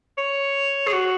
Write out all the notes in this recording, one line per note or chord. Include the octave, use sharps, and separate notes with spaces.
C#5
G#4
F#4